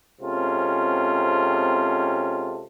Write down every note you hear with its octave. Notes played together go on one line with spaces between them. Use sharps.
C3 G#3 C4 C#4 F4 A4